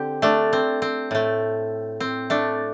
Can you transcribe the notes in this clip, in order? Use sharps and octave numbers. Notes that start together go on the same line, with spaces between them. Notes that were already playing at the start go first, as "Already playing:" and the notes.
Already playing: D3 C4 G4
A3 D4
C4
C4
A2 A3
C4
A3 D4